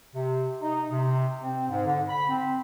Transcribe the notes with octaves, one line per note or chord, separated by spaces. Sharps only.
C3
D#4
C3
C4
G#2
D3
B5
C4